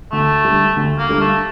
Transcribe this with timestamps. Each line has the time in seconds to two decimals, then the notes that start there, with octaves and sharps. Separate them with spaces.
0.12 D2 A3
0.45 D3 G3
0.76 D2
0.99 A#3
1.09 D3 G3
1.21 A3